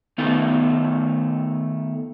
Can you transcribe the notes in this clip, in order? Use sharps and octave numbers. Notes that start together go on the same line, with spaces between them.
D#3 A3 B3 D#4